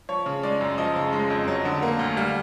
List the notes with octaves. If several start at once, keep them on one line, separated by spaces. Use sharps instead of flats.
F3 C#5
C#3
G#3 D5
F#2
F3 D#5
C#3
G#3
F2
F#3
D3
A#3
D2
G3 F5